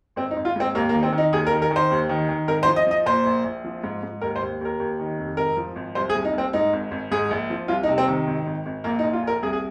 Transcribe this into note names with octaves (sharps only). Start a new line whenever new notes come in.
G#1 C4
D#4
G#1
F4
G#2 C4
D#2 A#3
A#3
D#3
C4
D#3
D#4
D#2 G#4
A#4
D#3
A#4
D#3
C5
D#2
D#3
D#3
G#1 A#4
C5
F3
D#5
F3 D#5
A#2 C5
A#1
A#1
F3
G#2
G#2
D#2 A#4
C5
D#2
D#2 A#4
D#2
D#3
F1
G#1 A#4
F3
G#1
C2 C5
G#4
C2
D#4
C2 C4
G#2 D#4
G#1
G#1
G#2 G#4
A#1
F3
C2 F4
D#4
C3
C4
D#3
G#1
G#1
G#1
A#1 A#3
D#4
A#2
F4
A#1 A#4
C2 G#4
G#4